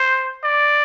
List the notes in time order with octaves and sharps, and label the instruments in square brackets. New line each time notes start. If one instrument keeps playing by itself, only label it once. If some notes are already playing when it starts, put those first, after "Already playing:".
Already playing: [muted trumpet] C5
D5